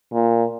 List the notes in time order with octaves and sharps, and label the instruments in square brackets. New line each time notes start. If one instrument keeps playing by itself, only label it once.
[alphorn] A#2